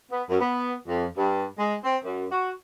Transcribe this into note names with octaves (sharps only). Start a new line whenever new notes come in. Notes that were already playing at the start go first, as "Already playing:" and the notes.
B3
F#2
B3
F2
G2
G#3
C4
F#2
F#4